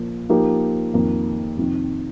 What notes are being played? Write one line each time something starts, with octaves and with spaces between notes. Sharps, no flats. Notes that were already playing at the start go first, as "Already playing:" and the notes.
Already playing: A#2 F3 A#3
F3 A#3 D#4 G4 A#4
F2 D#3 A#3
F2 C3 D#3